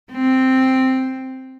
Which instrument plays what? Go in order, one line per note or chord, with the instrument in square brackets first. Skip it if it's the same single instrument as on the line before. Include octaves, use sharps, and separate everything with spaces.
[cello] C4